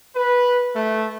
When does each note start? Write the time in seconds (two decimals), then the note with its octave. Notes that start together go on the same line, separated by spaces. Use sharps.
0.16 B4
0.74 A3